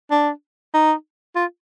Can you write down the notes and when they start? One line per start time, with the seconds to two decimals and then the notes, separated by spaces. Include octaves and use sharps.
0.11 D4
0.74 D#4
1.36 F4